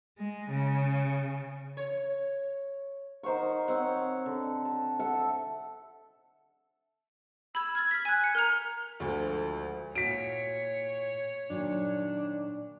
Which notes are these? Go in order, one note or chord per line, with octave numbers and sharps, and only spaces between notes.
G#3
C#3
C#5
D#3 C5 F#5 C#6
C4 C#5 F#5
D3
A5
A4 E5 F#5
B5 E6 G#6
F6 G#6 A6
F6 B6
G#5 F#6
G#6 C#7
A#4 A#5 F6
D2 D3 F3 G#3 F#4
A#2 E4 F#4 C#5 B6 D7
A#2 D#3 F#3 D4